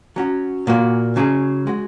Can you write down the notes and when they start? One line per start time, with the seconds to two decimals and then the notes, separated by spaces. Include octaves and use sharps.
0.16 F#3 C#4 F#4
0.67 A#2 A#3 F#4
1.16 C#3 F#3 C#4 G#4
1.67 G#3 F#4